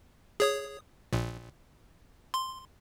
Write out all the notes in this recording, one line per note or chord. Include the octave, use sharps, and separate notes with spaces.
G#4 C#5 D#6
A#1 A#2
C6